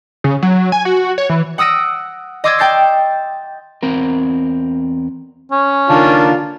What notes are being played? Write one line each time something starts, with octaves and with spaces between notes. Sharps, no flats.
C#3
F#3
G#5
F#4
C#5
E3
F#5 D#6 E6 A#6 D7
D#5 C6 D6 E6 G#6 A6
G5 A5 G6 A6 C7
E2 C4 A#4
C#4
D3 A#3 D4 D#4 F4